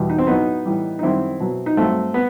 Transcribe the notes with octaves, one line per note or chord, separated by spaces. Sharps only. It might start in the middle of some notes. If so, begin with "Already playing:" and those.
Already playing: E2 B2 G3
D#4
C4
A2 F#3 B3 D#4
A2 E3 G3
D#4
F#2 D#3 G3 C4 E4
B2 F#3
D#4
G2 F#3 A3 C4
B3